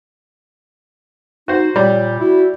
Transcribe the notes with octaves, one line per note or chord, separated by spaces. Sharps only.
D#4 F#4 C5
A#2 G3 C#5
E4 F#4